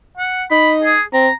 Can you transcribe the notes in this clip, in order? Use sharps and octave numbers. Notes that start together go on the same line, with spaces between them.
F#5
D#4 B5
G#4
C4 A#5